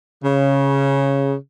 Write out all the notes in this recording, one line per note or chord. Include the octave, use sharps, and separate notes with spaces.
C#3